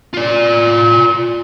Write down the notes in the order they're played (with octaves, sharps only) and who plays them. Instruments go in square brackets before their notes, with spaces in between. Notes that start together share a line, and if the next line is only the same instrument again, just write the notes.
[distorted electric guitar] F4 D5